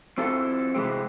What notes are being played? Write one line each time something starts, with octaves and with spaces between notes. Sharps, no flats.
C4 E4 F4 A4
C3 E3 G#3 C4